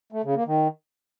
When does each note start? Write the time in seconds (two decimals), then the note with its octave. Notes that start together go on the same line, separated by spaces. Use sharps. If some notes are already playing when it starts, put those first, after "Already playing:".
0.12 A3
0.24 C#3
0.35 A#3
0.46 D#3